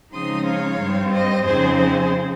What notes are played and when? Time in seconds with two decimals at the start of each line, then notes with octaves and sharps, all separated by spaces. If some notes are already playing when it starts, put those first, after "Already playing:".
0.12 C#3 F3 G#3 C4 D#4 C6 D#6
0.45 C#5 F5
0.78 G2 G3 C4
1.12 C5 D#5
1.45 F2 C#3 F3 C4 D#4 G#4 C5
1.78 G#4 C5